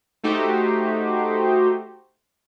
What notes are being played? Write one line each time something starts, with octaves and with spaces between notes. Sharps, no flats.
A3 D#4 F#4 G4 C5